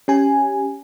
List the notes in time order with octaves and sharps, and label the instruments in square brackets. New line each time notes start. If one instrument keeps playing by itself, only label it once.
[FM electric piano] C#4 G4 G#5